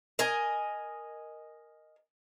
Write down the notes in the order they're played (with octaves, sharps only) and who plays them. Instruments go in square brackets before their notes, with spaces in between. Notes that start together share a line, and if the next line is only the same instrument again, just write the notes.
[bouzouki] A#4 D#5 G#5